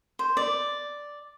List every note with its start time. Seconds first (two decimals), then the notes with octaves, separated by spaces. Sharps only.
0.19 C5
0.37 D5